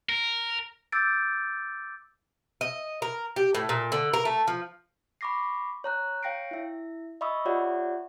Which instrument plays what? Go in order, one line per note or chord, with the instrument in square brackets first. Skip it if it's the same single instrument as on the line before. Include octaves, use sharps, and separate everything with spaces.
[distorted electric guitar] A#4
[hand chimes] D6 E6 G6 A6 D7
[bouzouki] D#5
A#4
G4
A2
A#2
D3
A#4
A3
F3
[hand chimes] B5 C#6 D6 A#6 C7
C#5 A#5 F#6
C#5 F5 G5 A#6 C7 D7
E4 E5
D#5 E5 B5 C#6 D#6 E6
F4 G4 C#5 D5 E5 F#5